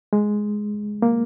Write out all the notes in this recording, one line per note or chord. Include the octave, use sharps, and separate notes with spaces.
G#3
A#3